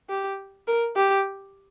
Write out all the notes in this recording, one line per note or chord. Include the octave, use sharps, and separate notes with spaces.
G4
A#4
G4